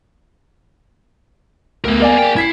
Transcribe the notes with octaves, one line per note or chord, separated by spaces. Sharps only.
D2 B3 A#4
A#3 D5 G#5
G#4 G5
E4 G#6 B6 C7